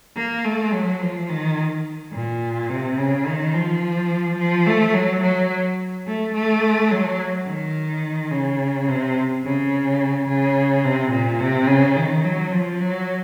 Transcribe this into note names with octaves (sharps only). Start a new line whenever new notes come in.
A#3
A3
F#3
F3
D#3
A#2
C3
C#3
D#3
F3
F3
A3
F#3
F#3
A3
A3
F#3
D#3
C#3
C3
C#3
C#3
C3
A#2
C3
C#3
D#3
F#3
F3
F#3